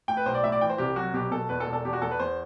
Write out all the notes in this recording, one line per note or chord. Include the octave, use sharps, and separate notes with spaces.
A2 G5
B4
B1 C5
D5
A2 E5
D5
E3 G5
C5
C2 G4
F#3 F#4
B2 G4
B2 A4
E2 B4
A4
E1
A4
E2 G4
F#4
E2 A4
B4
E2 C5